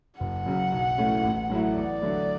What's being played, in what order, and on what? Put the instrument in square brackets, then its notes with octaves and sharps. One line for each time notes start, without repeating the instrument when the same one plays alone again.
[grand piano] F#1 [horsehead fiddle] F#5
[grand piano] F#2 C#3 F#3
B1
A2 E3 A3 C#4
A1
A2 F#3 A3 E4
[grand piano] E2 [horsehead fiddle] D5
[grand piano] D3 F#3 A3 E4